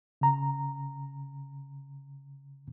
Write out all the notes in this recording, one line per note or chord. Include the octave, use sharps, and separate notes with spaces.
C#3 A#5